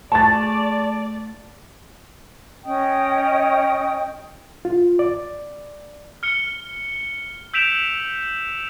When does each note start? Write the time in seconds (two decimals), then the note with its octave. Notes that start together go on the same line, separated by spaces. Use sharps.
0.12 A3 G#4 C#5 D5 A5 A6
2.66 C#4 D#5 G5 D#6
4.65 F4
4.99 D5
6.23 F6 C#7 G7
7.54 E6 G6 B6 D7 E7 F7